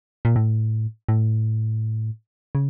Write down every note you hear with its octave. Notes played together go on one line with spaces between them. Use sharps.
A#2
A2
A2
C#3